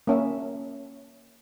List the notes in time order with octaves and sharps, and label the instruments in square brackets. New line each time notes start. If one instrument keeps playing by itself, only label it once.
[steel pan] A#3 C#4 E5